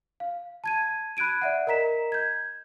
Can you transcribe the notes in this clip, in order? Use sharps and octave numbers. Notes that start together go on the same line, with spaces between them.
F5
A5 G#6 D#7
B5 F#6 G#6 D7 D#7
D5 E5 F#5
A#4 D#5 A#5 B6 E7
G6 G#6